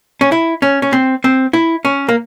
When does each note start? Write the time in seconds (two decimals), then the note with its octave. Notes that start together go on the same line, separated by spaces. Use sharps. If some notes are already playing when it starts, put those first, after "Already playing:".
0.21 C#4
0.32 E4
0.62 C#4
0.82 C#4
0.93 C4
1.24 C4
1.53 E4
1.85 C#4
2.09 A#3